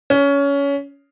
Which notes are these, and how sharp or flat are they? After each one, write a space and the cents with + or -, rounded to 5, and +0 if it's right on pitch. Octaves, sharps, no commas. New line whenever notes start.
C#4 +20